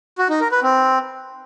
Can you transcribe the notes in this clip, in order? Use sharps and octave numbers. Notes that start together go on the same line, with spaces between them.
F#4
D#4
A#4
B4
C4